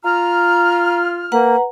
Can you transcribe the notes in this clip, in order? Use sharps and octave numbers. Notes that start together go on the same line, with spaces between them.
F4 A#5 F6
A#3 B4 F#5 A#5